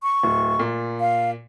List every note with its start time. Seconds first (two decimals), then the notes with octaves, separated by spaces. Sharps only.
0.03 C#6
0.23 D1
0.59 A#2
1.00 F5